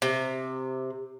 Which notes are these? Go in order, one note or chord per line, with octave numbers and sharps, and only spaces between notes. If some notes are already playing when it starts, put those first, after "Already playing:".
C3